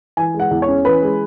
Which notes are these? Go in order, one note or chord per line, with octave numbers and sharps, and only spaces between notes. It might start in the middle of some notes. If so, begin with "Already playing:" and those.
E3 G#5
G#3
F#5
E2
C#5
C#4
E3 B4
G#3